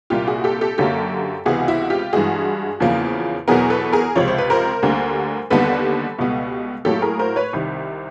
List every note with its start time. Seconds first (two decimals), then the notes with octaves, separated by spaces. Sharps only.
0.10 C2 A#2 G3 A#3 F4 G4
0.27 F#4 G#4
0.44 G4 A4
0.61 G4 A4
0.78 F#2 D3 F#3 A#3 G4 A4
1.46 C#2 C3 E3 G#3 B3 F#4 G#4
1.68 E4 F#4
1.90 F4 G4
2.13 G2 E3 G#3 F#4 G#4
2.80 E2 C#3 F3 A#3
3.48 E2 B2 F#3 B3 G#4 A#4
3.70 A4 B4
3.93 G#4 A#4
4.16 C#2 C3 F3 C#5
4.27 C5
4.38 B4
4.50 A#4 C5
4.82 D2 D3 G3 A#3
5.50 D#2 D3 G3 B3 A4 B4
6.19 C#2 B2 G3 B3
6.85 A2 F#3 A#3 G4 A4
7.02 G#4 A#4
7.19 A#4 C5
7.36 B4 C#5
7.53 C2 C3 D#3